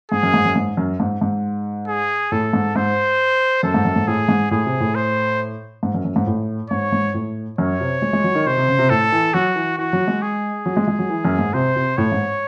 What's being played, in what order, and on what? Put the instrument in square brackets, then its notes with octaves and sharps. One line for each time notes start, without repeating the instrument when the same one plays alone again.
[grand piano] G#2 [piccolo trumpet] G#4
[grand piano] F#2
G#2
F#2
G#2
F#2
G#2
G#2
[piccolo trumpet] G#4
[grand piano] A2 [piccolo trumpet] A4
[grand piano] G#2
[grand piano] G#2 [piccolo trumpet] C5
[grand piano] F#2 [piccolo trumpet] A4
[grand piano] G#2
F#2
G#2
[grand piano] A2 [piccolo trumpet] G#4
[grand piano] G#2
[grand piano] A2 [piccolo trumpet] G#4
[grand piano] C3
A2
[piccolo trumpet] C5
[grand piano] G#2
F#2
F#2
G#2
A2
[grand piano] G#2 [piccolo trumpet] C#5
[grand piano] G#2
A2
[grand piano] F#2 [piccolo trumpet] C#5
[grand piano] C3
G#3
G#3
F#3
D#3
[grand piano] C3 [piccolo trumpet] C5
[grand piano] C3
C#3
C3
[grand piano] A2 [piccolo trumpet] A4
[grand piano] E3
[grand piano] F#3 [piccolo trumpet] F#4
[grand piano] E3
[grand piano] E3 [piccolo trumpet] F#4
[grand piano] F#3
G#3
[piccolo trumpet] G#4
[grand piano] F#3
G#3
G#3
F#3
E3
F#2
G#2
[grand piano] C3 [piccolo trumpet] C5
[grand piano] C3
[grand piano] A2 [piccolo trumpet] C#5
[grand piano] G#2